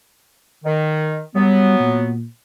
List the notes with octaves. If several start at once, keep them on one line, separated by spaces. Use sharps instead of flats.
D#3
F#3 G3 B3
A#2